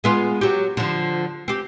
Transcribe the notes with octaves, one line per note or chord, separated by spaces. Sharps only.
G#3 B3 F4
F#3 G4
D3 F3
C4 G4